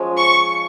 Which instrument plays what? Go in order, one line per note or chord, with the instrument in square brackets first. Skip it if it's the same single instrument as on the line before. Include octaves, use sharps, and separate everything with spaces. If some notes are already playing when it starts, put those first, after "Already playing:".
Already playing: [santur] F3 G#3 C#4
[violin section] C#6